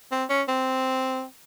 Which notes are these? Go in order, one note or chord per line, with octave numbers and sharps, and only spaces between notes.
C4
C#4
C4